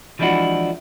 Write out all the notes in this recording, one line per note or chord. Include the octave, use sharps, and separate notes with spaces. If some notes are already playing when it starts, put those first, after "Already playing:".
E3 F3 G#3 D4 E4 F#4